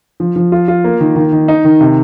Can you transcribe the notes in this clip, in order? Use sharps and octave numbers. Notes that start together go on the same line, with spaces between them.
F3
F3
F4
F4
A#3
D#3
D#3
D#3
D#4
D#3
C3